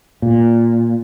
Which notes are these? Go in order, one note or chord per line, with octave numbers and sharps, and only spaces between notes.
A#2